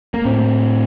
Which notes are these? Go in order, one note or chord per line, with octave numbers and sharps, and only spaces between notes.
A#3
A2 C4